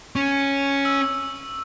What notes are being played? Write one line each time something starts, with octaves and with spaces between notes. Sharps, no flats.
C#4 C#6
E6